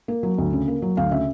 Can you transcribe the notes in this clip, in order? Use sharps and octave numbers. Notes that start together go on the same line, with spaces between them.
A#3
F#3
D2
C#3
A#3
F#3
D2 F5
C#3 E5